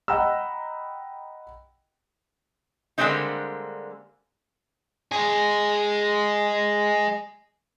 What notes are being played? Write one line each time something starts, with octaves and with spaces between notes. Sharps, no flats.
D#5 F#5 G5 A#5 B5 E6
D3 G3 G#3 A#3 C4 D#4
G#3 G#4